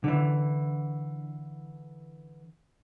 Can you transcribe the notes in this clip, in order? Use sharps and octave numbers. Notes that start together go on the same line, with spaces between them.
D3 E3